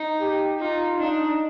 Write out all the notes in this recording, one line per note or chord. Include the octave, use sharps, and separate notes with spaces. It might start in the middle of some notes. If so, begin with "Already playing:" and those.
Already playing: D#4
G4
D#4 F4
D4 D#4